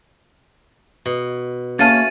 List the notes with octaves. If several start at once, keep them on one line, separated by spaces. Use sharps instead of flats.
B2
A3 A#3 C#4 F5 A5 A6 D#7